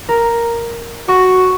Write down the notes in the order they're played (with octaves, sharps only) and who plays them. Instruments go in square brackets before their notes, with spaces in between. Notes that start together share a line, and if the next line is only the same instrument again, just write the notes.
[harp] A#4
[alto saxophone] F#4 [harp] C#6